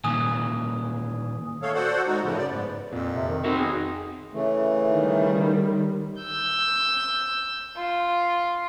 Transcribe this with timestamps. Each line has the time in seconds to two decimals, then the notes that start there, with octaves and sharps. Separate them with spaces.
0.04 A#2 D#3 E3 G#5 D#6
1.62 A3 A4 C#5 F5
1.74 F#4 A4 C5 D5 F#5
2.07 G#3 D#4 F#4
2.23 F#2 A2 C#3 F3
2.38 D5
2.51 G#2 B3
2.93 F2 A#2
3.15 C3
3.27 D#3
3.44 C4 D#4 F#4
3.58 G#4
4.33 C#3 E3 A3
4.88 D#3 G3
6.22 E6 G6
7.77 F4